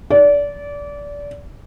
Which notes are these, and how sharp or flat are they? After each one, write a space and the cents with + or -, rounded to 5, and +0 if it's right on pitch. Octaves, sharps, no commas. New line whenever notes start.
D5 -25